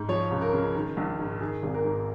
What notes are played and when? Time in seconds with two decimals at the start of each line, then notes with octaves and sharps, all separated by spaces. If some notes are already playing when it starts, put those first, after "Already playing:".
Already playing: G#2
0.09 F3 C#5
0.31 C#2
0.42 A#4
0.53 C#3
0.75 D#3
0.97 A#1
1.19 G#2
1.41 D#3 G#4
1.63 G#1
1.74 A#4
1.85 G#2